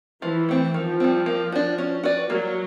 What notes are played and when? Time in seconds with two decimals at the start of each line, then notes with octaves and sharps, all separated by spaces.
0.22 E3 F3
0.49 A3 C4
0.74 D#3 F3
1.00 G3 C4
1.26 A#3
1.52 D4 F#4
1.78 C#4
2.04 F#4 B4 D5
2.30 F#3 A#3